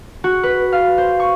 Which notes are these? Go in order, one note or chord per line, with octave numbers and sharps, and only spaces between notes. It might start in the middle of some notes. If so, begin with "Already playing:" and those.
F#4
B4
F5
C5
C#6